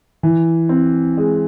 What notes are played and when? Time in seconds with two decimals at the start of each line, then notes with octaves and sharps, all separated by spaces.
0.23 E3
0.69 C4
1.17 G#3